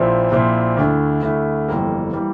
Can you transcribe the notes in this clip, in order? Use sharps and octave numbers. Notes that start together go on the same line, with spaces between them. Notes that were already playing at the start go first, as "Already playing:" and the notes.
Already playing: A#1 A#2 F3 C4 E4
A#1 A#2 F3 C4 E4
D2 D3 A3 E4
D2 D3 A3 E4
G1 F2 E3 G3 A#3
E3 G3 A#3